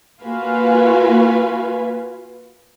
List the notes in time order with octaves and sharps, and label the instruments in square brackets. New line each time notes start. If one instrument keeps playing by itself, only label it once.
[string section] A#3 F4 F#4 B4 F5 G#5